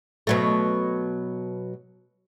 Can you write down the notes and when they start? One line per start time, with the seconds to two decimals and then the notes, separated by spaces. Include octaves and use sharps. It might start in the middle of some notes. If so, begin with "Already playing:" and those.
0.27 B2 F#3 A3